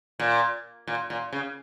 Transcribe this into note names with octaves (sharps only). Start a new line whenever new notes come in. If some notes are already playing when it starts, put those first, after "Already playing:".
A#2
A#2
A#2
C#3